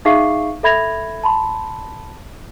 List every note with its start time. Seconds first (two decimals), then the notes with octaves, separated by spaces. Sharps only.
0.05 D#4 G#4 E5 F5 C#6 C7
0.63 A4 E5 B5 G#6 A#6 F7
1.24 A5 B5 C6